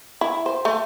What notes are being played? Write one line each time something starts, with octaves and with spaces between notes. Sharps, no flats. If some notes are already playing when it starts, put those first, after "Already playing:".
E4
C5
A3